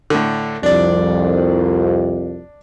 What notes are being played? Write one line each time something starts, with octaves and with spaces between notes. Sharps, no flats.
A2 D3
C2 F2 D4 D5